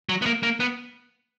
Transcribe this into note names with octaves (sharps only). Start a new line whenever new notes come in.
F#3
B3
A#3
A#3
B3